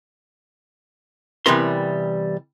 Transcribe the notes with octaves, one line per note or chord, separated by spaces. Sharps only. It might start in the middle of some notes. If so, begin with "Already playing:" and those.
C3 E3 G3 B3 A#4 C6